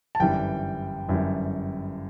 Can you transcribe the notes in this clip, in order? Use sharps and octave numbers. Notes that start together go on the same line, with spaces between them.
A5
G1 F#2 E3 G3 G5
G1 F#2 E3 G3